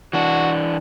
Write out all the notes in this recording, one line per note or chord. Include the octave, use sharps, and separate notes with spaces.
E3 D4 F#4